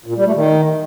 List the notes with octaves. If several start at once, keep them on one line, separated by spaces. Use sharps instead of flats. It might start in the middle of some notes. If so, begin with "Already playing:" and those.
A#2
G3
A3
D#3